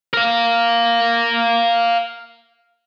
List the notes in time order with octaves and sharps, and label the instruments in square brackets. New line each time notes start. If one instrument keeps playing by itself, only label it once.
[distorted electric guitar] A#4 F5